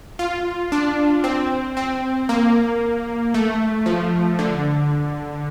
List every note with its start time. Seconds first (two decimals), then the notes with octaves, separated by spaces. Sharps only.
0.19 F4
0.72 D4
1.24 C4
1.77 C4
2.29 A#3
3.34 A3
3.86 F3
4.39 D3